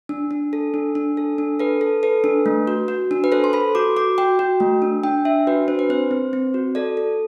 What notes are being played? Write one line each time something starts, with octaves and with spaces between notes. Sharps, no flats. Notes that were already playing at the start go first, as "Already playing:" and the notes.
D4
D4
A4
D4
D4
A4
D4
A4 B4
A4
A4 B4
D4
A3
F#4
F#4
D4
B4
A4 C5
C6
A4 B5
F#4 D6
F#4 D6
F#4 G5
F#4
A3
D4
D4 G5
D4 E5
F#4 B4
D4 C5
B4
C4 C5
C4
C4
F#4
A4 D5
A4